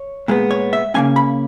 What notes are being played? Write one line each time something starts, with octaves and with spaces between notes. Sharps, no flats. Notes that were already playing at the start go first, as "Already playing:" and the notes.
Already playing: C#5
A#2 G#3 B3
C#5
E5
C#3 E3 A#3 C#4 G#5
B5